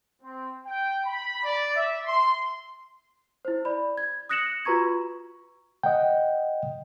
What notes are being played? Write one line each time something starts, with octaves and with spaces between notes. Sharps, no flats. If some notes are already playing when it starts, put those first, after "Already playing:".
C4
G5
B5
D5
E5
C6
E4 C5
D5 B5
G#6
D#6 F#6 A#6 C#7 E7 F#7
F4 F#4 B4 A#5 C#6 G#6
D#5 F#5 G5